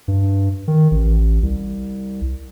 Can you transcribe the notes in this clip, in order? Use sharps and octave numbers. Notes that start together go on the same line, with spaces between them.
G2
D#3
A1
C2